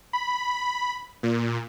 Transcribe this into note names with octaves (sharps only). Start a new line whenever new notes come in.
B5
A#2